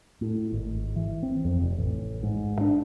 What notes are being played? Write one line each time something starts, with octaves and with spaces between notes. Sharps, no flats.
A2
G#1
E3
C4
F2
F1
A1
G#2
D4